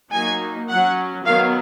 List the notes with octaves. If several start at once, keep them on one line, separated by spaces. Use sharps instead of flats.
F#3 A#3 D#4 G#5
F#3 C#4 F#5
D#3 F#3 B3 F5